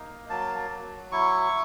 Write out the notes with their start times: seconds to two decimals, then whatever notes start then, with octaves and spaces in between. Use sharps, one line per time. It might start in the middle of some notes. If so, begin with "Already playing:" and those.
Already playing: A#3 D#4
0.30 F#3 A5
0.71 F#3
1.12 E4 C#6